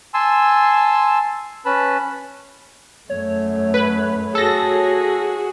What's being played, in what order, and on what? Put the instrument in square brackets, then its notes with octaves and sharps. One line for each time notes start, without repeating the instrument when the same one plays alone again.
[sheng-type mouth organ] G#5 A5 C6 E6
C#4 B4 A5 B5
[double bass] F#2 A3 [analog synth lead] C#5
[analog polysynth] B4
[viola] F#4 G#4 [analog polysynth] A4 A#6